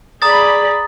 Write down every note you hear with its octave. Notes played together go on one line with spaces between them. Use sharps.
G#4 D5 A#5 B5 D#6 A6